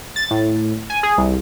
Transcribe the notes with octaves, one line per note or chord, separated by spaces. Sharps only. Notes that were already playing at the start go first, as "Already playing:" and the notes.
A6
A2
G#5
G#4
C2